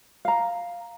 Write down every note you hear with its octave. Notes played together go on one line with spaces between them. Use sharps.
F5 A#5